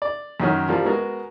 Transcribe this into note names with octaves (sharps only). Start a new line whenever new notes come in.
D5
F#2 D#3 F#3 C#4
F3 G3 A#3
G#3 B3 F#4 G#4 A#4